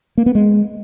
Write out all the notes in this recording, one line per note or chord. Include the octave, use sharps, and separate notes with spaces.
A#3
B3
G#3